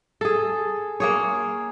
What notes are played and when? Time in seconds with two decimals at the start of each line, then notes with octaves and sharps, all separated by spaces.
0.21 G#4 A4
1.00 A#3 G#4 C#5